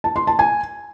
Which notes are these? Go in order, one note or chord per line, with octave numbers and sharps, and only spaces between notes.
A5
C6
A5
G#5